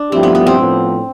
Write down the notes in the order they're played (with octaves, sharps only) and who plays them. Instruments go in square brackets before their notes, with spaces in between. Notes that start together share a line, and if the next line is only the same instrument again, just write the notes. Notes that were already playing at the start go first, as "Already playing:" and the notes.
Already playing: [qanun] D4
[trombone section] G2 F3 A3 E4 G4 [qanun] C4
[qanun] B3
B3
C4
[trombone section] A2 F3 B3